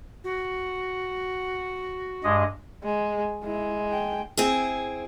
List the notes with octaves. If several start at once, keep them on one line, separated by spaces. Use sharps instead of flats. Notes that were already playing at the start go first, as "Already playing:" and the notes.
F#4
G2 G#3 D#5
G#3
G#3 E4
G5
C4 E4 G#4